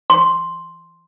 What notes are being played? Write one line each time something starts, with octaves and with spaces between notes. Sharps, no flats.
C6